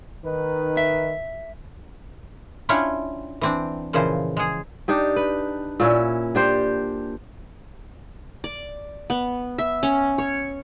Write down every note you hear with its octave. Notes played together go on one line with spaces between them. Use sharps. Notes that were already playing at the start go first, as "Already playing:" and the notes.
D#3 D#4 B4
E5
C#4 D4 E4 F4 C#5 G5
E3 C4 D4
A#2 C#3 E3 F3 C5
G#3 G#4
D4 D#4 G4
B4
A#2 C#4 E4
D4 G4 C5
D5
B3
E5
C#4
C#5